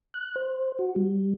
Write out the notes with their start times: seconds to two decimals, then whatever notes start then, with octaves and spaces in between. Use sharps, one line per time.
0.14 F#6
0.36 C5
0.79 F#4
0.96 G3